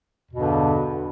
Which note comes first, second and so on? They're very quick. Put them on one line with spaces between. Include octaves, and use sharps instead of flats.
E2 B2 G2 D3